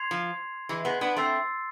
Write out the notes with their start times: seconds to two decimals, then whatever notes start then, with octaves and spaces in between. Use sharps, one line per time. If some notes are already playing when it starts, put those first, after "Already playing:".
Already playing: C6 G#6 C7 F7
0.11 F3
0.69 E3 G#3
0.85 G#3 B3
1.01 B3 D4
1.17 A3 C4 C6 E6 A6 C7